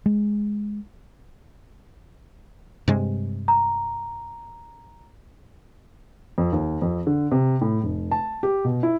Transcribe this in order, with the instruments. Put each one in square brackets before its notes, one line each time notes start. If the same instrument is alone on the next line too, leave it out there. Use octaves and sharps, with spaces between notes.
[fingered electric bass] G#3
[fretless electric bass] G2 C3 G#3
[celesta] A#5
[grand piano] F2
D#2
F2
D3
C3
A2
F1
A5
G4
B2
E4